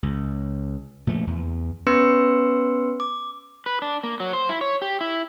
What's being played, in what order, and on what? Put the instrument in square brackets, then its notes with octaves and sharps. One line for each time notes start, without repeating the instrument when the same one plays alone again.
[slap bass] C#2
A#2 F3 A3
E2
[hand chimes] B3 C#4 B4 C6 E6 C#7
D6
[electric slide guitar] B4
D4
A#3
F#3
C5
E4
C#5
G4
E4